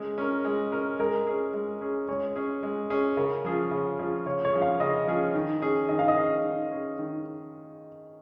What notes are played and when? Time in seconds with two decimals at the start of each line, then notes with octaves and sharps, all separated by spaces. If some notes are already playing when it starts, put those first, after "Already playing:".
Already playing: G#3 C#4
0.18 C#4 A#4
0.45 G#3
0.72 C#4 A#4
0.99 G#3 A#4
1.27 C#4 G#4
1.53 G#3
1.81 C#4 G#4
2.08 G#3 C#5
2.36 C#4 G#4
2.63 G#3
2.90 C#4 G#4
3.17 C#3 A#4
3.45 F3 C#4 F4 G#4
3.71 C#3
3.99 F3 C#4 F4 G#4
4.26 C#3 C#5
4.45 C#5
4.53 F3 C#4 F4 G#4
4.62 F5
4.80 C#3 D#5
5.07 F3 C#4 F4 G#4
5.35 D#3
5.62 C#4 G#4
5.89 D#3 D#5
5.99 F5
6.08 D#5
6.16 C#4 G#4
6.44 D#3
6.71 C#4 G#4
6.98 D#3